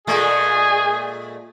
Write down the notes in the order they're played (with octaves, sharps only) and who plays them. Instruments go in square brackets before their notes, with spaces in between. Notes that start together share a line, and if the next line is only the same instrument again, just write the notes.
[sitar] A#2 G#3 A3 [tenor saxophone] G#4